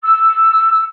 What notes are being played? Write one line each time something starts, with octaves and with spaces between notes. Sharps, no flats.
E6